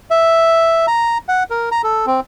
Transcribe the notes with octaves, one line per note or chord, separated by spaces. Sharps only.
E5
A#5
F#5
A#4
A#5
A4
C4